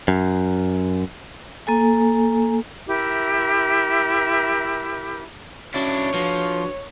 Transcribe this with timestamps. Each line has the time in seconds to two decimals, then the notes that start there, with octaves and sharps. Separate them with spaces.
0.08 F#2
1.67 A#3 A4 G#5
2.87 E4 G4 A#4 E5
5.74 C#4 D4 E4 F#4 C#5 D5
6.14 F3 D4 F#4 B4